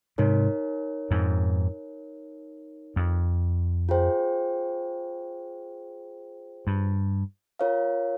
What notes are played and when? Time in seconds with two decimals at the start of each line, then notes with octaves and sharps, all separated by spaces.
0.18 G#2 C3 D#4 A#4 C#5
1.11 F2 G#2
2.96 F2
3.89 F4 G#4 C5 G5
6.67 G2
7.59 F4 A#4 C#5 F5